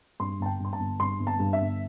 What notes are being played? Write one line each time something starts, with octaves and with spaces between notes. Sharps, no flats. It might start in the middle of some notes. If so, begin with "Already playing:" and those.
G2 C6
G1 A5
G5
G2 C6
A5
G1
G2 C6
G1
A5
G2
E5
G1